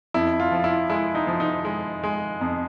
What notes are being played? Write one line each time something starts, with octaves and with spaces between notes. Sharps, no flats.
F2 E4
F4
F3
E4
G#3 E4
D#4
F3
D#4
G#3
G#3
F2